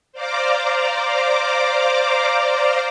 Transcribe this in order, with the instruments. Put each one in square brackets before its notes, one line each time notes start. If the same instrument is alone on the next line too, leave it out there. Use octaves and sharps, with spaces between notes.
[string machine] C5 D5 F5 A#5 D6